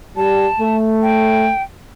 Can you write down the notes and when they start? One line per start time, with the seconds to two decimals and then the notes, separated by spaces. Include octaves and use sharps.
0.17 G3 A5
0.59 A3
1.02 G5